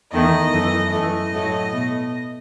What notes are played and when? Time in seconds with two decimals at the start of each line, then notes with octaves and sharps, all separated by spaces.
0.12 E2 D#3 A3 D#5
0.52 F#2 E3 A3
0.91 F#2 E3 A3 D#5
1.31 A2 F#3 A3
1.72 B2 A3